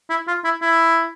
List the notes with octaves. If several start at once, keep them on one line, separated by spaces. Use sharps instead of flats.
E4
F4
E4
E4